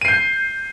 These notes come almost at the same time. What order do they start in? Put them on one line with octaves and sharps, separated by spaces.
D#7 C7 G6